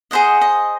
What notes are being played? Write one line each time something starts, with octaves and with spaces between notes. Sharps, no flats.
G#4 C5 D#5 F#5
D#5